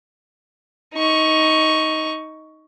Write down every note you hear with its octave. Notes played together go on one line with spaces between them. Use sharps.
D#4 C#6